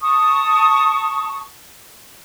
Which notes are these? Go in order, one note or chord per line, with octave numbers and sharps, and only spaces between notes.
A5 C#6 D#6